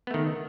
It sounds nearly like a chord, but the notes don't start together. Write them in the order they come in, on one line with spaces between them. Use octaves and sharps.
B3 A3 D#3